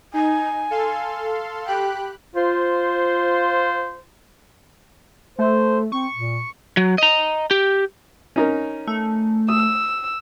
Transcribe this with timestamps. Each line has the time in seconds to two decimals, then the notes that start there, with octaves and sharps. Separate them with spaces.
0.14 D#4 G#5
0.70 A4 F5 C6
1.67 G4 G5 B5 F#6
2.35 F4 C5
5.39 A3 C5
5.92 C4 C#6
6.15 A#2
6.77 F#3
6.98 D#5 A#5
7.51 G4
8.36 C#4 D#4 A#4
8.87 A3
9.49 D#6 E6